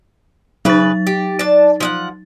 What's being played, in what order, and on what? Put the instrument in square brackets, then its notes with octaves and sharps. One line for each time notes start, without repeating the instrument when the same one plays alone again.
[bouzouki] C#3 B4 [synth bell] F#3 D#4 A6
[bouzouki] G4
D4 A5
F3 D#5 F#5